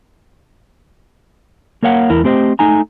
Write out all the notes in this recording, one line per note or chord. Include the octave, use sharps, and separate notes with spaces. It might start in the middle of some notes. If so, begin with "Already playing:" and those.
A#3 A#4 C#5 F5 F#5
E2 E4 A#4
A3 C4 G4 C5 D#5
A3 D#4 G#5 A#5